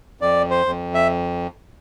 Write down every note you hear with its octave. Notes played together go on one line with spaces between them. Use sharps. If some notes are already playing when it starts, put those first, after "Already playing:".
F2 D5
C5
F2
E5